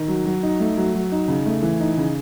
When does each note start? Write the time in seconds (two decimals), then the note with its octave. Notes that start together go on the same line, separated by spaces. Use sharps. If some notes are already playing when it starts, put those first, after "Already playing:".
Already playing: D#3
0.08 F#3
0.25 F#3
0.43 D#4
0.60 A3
0.77 F#3
0.94 F#3
1.12 D#4
1.28 C#3
1.46 A3
1.63 E3
1.80 D#4
1.97 C#3